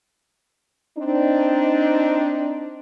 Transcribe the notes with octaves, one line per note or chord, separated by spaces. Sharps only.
C4 D4 D#4